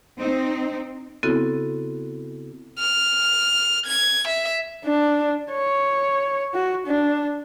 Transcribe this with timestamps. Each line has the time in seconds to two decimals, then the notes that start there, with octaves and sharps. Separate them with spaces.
0.19 C4 D#4
1.23 C#3 B3 C4 E4 F#4 A4
2.79 F6
3.86 G#6
4.27 E5
4.85 D4
5.52 C#5
6.54 F#4
6.86 D4